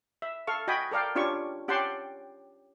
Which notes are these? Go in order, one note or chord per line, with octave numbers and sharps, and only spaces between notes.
E5
A4 F5 C#6
F#4 D#5 G5 G#5 B5
A4 A#4 D5 F5 G5
C#4 D4 F4 G4 C#5 C#6
C#4 G4 F#5 G5 A5 C6